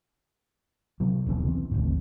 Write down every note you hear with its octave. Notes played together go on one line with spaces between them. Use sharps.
C3 F#3
D#1 B1 C#3 E3
C4
D#1 A1 D2 A2